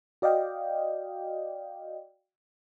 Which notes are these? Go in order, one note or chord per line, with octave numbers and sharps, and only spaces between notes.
F#4 D5 D#5 F5 G5